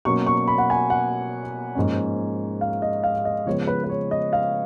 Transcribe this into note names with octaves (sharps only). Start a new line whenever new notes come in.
B2 F#3 A#3 C#4 C#6
C#6
B5
F#5
G#5
F#5
G#2 F3 A#3 C#4
F5
D#5
F5
D#5
C#3 F3 G#3 B3 C#5
B4
B4
C#5
D#5
F5